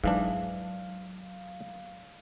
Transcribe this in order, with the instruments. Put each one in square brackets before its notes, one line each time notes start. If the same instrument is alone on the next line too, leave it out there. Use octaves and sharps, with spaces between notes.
[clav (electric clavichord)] G#2 E3 D4 [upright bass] F#3 [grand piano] F5